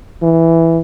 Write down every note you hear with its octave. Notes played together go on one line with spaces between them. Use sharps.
E3